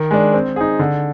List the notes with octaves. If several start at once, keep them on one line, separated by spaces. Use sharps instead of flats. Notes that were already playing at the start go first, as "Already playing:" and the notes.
Already playing: D#3
G#3 D4
C4
D#4 G#4
D3